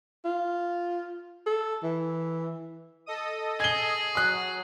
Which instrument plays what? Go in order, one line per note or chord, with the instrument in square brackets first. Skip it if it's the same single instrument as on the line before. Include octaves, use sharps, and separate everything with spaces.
[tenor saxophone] F4
A4
E3
[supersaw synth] A4 D#5 D#6
[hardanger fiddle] G#4 [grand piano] G#6 G7
[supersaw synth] F#3 [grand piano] D#6 F#6